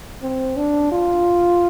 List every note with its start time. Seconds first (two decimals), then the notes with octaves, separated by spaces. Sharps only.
0.22 C4
0.57 D4
0.92 F4